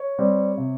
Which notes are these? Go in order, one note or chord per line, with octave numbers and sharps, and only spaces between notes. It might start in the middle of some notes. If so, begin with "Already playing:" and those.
Already playing: C#5
G3 C4
C3